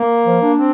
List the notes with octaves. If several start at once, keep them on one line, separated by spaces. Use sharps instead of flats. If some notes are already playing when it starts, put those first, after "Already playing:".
Already playing: A#3
F3
D4
C4